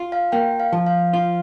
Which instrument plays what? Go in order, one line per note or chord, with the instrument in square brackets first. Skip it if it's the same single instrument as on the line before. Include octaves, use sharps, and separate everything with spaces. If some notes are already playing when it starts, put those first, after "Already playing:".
Already playing: [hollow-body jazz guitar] F4
[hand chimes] F5
[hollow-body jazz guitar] A#3 [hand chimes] G5
[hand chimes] F5
[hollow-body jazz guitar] F3
[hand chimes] F5
[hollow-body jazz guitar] F4